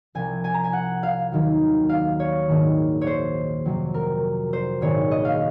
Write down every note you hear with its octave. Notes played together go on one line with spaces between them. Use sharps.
C2 C3 F3 G#5
G#5
A#5
G#5
F#5
F5
D#2 D#3 F#3
F5
C#5
A#1 G#2 D#3
C#5
C5
F2 C3 F#3
A#4
C5
A#1 G#2 D#3 G#3 C#5
D#5
F5